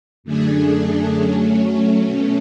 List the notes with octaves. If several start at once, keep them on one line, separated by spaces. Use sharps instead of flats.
F#2 D3 A3 D4 G#4
F#3 A3 C#4
B2 A3 C#4